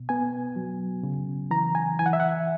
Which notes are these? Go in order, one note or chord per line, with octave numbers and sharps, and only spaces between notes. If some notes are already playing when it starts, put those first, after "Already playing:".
Already playing: B2
B3 G#5
F#3
C#3
E3 A#5
G#5
E3 G#5
F#5
E5
F#5